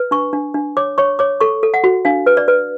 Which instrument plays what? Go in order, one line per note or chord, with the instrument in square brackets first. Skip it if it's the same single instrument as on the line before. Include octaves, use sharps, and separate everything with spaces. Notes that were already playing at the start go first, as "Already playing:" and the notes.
Already playing: [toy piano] B4
D4 C#6
D4
D4
C#5 D6
C#5 C#6
C#5 D6
A4 C#6
A4
F#5
F#4
D4 F5
B4
D5
B4